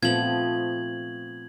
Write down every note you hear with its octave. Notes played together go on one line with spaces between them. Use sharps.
A#2 F3 A3 B3 C4 G#6 F#7